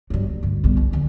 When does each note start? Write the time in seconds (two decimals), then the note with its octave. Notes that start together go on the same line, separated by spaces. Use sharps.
0.10 G2 F#3
0.26 D#2
0.43 D2 G2
0.64 B1 G3
0.77 F2
0.92 D#2 D3